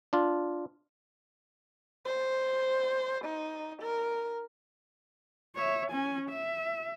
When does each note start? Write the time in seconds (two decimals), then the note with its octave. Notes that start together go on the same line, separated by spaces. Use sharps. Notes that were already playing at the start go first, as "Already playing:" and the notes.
0.13 D4 F4
2.05 C5
3.25 D#4
3.82 A#4
5.56 C#5 E5
5.91 C#4 G#5
6.29 E5